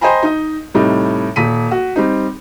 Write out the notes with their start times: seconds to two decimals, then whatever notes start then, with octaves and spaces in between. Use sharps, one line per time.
0.01 C5 D#5 G5 G#5 A#5 B5
0.23 D#4 D#5
0.74 A2 C3 G3 D#4
1.36 D#1 B6 D#7
1.71 F#4
1.96 G3 C4 D#4